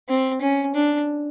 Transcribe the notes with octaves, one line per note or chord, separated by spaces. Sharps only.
C4
C#4
D4